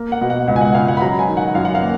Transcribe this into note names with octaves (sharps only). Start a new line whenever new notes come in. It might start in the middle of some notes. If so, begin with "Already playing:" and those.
Already playing: A#3
F#5
B2
F#5
C#2 F#5
G#5
F#5
C#2 F5
F#5
B5
F#3 A#5
G#5
D#3
F#5
F#2 F5
F#5
F5
A#3